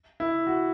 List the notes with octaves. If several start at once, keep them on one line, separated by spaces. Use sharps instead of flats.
E4
F#4